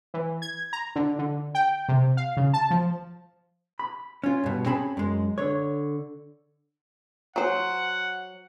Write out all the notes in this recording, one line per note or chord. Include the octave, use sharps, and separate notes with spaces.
E3
G#6
A#5
D3
D3
G5
C3
F5
C#3
A5
F3
B5
C#4 F4
G2 B2
C4 C#4 G#4 A5 B5
F#2 G#3
D3 C#5
F#3 C5 F#5